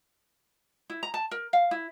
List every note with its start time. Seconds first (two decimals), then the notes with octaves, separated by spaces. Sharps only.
0.90 E4
1.03 A#5
1.14 A5
1.31 A#4
1.53 F5
1.71 E4